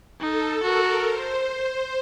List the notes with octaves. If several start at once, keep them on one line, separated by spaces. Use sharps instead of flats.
D#4 A4
F#4 A#4
C5